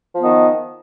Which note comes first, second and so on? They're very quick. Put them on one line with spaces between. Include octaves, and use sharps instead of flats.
F3 B3 D#3